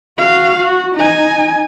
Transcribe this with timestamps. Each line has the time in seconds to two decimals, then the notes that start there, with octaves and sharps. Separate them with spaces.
0.18 F#4 F5
0.57 F#4
0.95 D#4 G#5